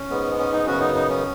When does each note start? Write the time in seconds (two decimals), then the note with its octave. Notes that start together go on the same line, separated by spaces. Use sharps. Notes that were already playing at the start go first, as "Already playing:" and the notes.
Already playing: C#4
0.10 G#2 G#3 B3
0.39 C#4
0.53 D#4
0.66 F#2 C#3 B3 C#4 F#4
0.80 D#4
0.94 D#4
1.10 C#4